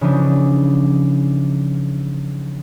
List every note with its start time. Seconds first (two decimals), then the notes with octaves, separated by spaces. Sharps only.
0.01 C#3 E3 F3 D4 D#4